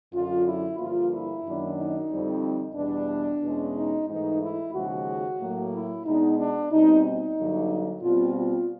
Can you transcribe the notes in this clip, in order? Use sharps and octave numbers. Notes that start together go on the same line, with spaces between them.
F#2 D3 F#3 F4
E4
G2 D3 F3 A#3 F4
E4
F#2 D#3 F#3 A#3 D4
D#4
F2 D3 G3 C4
E2 B2 G3 B3 D4
E2 B2 G#3 C#4
D#4
G#2 E3 A3 D#4
E4
D#2 C#3 F3 G#3 F#4
A2 F#3 A#3
E4
B2 G#3 B3 D4 D#4
D4
B2 G3 C4 D#4
D#4
G2 D3 F#3 A#3
B2 G3 C4 F4
F4